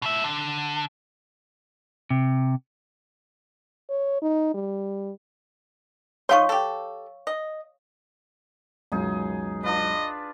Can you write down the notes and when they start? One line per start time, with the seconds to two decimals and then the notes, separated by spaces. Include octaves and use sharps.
0.02 B2 E5
0.24 D3
2.10 C3
3.90 C#5
4.22 D#4
4.54 G3
6.29 F3 D#4 C#5 F5 C6 C#6
6.49 G4 A4
7.27 D#5
8.92 C#2 F#2 B2 D#4 G#4
9.63 D4 F4 B4 D#5